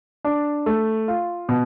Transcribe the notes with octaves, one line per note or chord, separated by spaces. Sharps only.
D4
A3
F4
B2